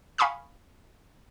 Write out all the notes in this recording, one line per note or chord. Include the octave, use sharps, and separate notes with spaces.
F5 G#5 B5 C#6 D#6 F6